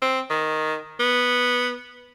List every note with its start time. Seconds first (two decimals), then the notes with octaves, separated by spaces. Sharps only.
0.02 C4
0.30 D#3
1.00 B3